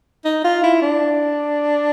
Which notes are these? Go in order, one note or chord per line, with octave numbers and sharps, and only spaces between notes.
D#4
F4
E4
D4